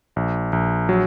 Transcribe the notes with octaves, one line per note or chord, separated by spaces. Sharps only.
A#1
A#1
F#3